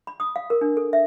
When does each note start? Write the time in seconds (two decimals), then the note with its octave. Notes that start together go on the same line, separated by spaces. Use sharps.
0.07 B5
0.20 D#6
0.36 F5
0.50 A#4
0.61 D4
0.77 A4
0.93 E5